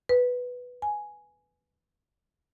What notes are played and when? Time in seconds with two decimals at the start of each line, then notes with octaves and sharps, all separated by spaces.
0.09 B4
0.82 G#5